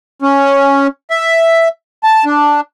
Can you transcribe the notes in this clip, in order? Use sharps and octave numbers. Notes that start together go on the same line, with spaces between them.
C#4
E5
A5
D4